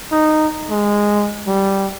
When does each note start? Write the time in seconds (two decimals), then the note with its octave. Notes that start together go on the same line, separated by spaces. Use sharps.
0.12 D#4
0.70 G#3
1.47 G3